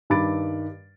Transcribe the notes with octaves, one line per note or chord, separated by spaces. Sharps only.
G2 D#3 B5 D6 A6 D7